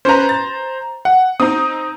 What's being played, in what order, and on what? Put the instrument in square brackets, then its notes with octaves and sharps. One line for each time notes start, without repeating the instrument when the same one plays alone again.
[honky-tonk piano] C#4 B4 [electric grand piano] C5 A#5
[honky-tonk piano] A6
[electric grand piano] F#5
[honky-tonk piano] C4 D#4 [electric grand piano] D#6